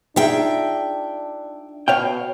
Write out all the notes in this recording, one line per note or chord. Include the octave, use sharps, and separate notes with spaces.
D4 D#4 F4 G#4 E5 G5
B2 C#5 F5 G5